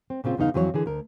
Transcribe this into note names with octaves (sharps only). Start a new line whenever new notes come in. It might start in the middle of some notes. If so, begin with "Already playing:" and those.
C4
A#2 C#3 C4 F4
E2 C#3 B3 D#4 F5
F2 E3 F#3 B4 C#5
D3 E3 G#4
D2 A#4